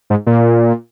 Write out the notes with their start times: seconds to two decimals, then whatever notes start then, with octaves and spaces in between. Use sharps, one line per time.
0.10 G#2
0.26 A#2